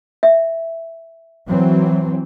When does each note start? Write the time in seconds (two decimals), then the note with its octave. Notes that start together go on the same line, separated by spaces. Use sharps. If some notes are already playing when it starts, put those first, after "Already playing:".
0.23 E5
1.49 E3 F#3 C4